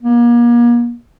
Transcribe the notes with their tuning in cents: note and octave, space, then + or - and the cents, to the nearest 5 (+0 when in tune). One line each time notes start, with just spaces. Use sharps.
A#3 +35